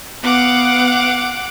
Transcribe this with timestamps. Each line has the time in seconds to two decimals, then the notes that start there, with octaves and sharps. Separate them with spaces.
0.23 B3 F5 F#5 D6